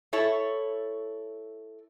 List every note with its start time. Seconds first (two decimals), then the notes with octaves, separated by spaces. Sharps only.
0.13 E4 A4 C#5